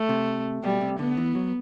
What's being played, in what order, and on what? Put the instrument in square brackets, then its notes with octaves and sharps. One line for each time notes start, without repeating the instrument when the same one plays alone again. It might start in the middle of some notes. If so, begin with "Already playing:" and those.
Already playing: [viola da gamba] A3
[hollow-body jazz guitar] C3
[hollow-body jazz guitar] B2 [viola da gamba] G3
[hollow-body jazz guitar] C3
[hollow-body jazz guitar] D3 [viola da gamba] B3
[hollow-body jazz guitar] E3
F#3